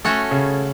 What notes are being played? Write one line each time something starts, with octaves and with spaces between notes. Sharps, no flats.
A3 C#4 F#4 A4
C#3